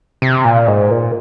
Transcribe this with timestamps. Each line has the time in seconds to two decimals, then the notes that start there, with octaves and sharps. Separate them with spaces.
0.22 C3
0.45 A#2
0.67 G#2
0.91 A#2